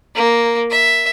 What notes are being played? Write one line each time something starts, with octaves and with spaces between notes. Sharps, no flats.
A#3
E5